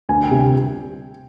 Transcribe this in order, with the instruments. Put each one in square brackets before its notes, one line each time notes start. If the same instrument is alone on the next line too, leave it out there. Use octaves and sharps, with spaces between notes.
[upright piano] D2 G#5
G5
C3 G3
G5